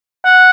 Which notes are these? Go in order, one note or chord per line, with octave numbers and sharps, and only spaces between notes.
F#5